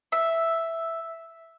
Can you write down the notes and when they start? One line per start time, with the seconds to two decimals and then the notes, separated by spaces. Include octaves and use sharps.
0.12 E5